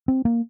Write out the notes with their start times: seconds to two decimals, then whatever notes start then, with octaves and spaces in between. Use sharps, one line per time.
0.08 C4
0.25 A#3